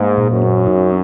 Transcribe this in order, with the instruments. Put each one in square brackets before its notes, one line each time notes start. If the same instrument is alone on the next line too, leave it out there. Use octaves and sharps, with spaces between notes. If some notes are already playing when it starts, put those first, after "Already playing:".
Already playing: [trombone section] G#2 [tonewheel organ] A#3
[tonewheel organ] A#2
[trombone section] F#2
[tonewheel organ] C#4
D#4